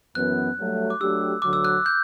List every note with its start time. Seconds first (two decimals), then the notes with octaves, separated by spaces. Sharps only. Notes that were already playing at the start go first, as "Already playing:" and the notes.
0.15 F#2 E3 B3 F#6
0.58 G2 F#3 A3
0.90 D6
1.00 F#3 A3 D4 G4 E6
1.42 D2 D3 F#3 D6
1.53 E6
1.65 F#6
1.86 G6